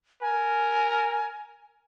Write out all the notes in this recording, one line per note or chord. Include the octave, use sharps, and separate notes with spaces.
A#4 G#5